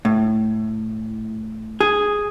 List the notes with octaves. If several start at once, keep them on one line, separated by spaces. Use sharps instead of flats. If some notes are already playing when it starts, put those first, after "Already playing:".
A2
G#4